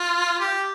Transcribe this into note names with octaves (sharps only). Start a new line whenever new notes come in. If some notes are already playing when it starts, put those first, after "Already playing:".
Already playing: F4
G4